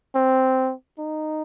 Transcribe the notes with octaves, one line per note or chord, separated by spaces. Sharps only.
C4
D#4